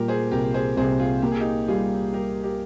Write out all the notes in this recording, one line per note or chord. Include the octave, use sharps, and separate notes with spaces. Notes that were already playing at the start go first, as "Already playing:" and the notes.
Already playing: A#2 G3 G4 A#4
G#4 C5
C2 G4 A#4
G#4 C5
C2 G#4 C5
F4 G#4
A#3 G4
G#4
D#4 G4
G3 F4 G#4
G3 G4 A#4
G4 A#4